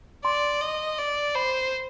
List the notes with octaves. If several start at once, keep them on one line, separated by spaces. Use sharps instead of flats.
D5 C6
D#5
D5
C5 B5